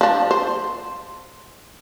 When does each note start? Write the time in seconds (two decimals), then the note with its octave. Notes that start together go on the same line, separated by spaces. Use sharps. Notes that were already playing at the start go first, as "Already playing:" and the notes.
0.01 F3 D4
0.31 C5